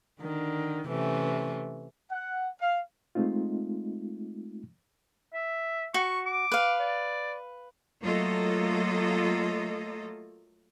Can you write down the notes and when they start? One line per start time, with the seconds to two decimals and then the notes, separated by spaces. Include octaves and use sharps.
0.21 D3 D#3
0.88 C3 E3 A3 C#4
2.11 F#5
2.61 F5
3.15 G#3 A3 C4 D#4 F4
5.33 E5
5.94 F#4 C#6
6.26 D6
6.52 B4 F5
6.80 D5
8.02 F#3 A3 A#3 F4 A4 D#5